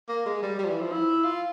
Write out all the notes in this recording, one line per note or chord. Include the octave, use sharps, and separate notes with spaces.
A#3
G#3
G3
G3
F3
E3
F3
E4
F4